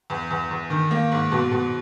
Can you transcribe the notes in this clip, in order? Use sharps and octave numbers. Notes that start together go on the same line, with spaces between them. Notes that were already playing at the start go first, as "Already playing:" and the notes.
E2
E2
E2
D#3
A#3
G#2
B2
B2